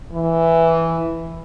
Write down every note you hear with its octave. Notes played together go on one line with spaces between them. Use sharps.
E3